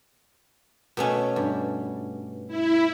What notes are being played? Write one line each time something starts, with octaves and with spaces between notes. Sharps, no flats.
B2 A3 C#4
G2
E4